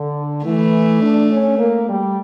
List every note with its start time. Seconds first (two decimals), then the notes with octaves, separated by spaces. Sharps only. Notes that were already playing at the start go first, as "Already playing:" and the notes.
Already playing: D3
0.45 E3 A3
1.02 D4
1.31 C#4
1.59 A#3
1.88 G3